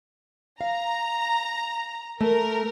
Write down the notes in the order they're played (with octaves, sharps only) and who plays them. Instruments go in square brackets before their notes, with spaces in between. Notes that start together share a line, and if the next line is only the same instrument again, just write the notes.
[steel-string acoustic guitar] F5 [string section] A#5
[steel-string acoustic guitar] A3 [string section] A#4